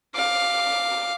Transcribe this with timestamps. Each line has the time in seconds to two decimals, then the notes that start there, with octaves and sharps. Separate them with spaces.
0.15 F5 D6